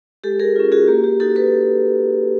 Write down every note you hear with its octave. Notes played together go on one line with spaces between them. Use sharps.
G#3 G4 A4
G#4 A#4
C#4 F4
F#4 G#4
A#3 G4
G4
D#4 F#4 G4 A4
A4 B4